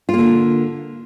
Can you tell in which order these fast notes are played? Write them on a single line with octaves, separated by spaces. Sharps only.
F4 A#3 D3